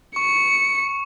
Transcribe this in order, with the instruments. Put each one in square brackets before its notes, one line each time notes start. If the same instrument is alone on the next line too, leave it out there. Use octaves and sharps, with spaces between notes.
[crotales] C#6 [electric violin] C#7